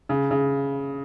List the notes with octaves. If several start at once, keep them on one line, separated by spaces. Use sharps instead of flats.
C#3
C#3